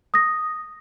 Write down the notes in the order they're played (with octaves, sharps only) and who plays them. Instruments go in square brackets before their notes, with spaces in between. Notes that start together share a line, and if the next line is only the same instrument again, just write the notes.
[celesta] D#6 A#6